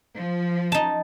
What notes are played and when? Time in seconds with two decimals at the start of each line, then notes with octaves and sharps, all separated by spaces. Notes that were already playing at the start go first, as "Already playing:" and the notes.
0.16 F3
0.72 D#4 A5